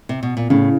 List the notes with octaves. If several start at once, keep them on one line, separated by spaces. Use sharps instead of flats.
C3
B2
A#2
A2 C#3